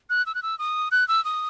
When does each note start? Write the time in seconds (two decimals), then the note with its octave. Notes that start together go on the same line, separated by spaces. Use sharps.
0.10 F#6
0.26 E6
0.35 F#6
0.43 E6
0.59 D#6
0.92 F#6
1.08 E6
1.25 D#6